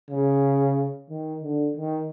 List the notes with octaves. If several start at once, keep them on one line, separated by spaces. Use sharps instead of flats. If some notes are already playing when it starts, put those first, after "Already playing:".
C#3
D#3
D3
D#3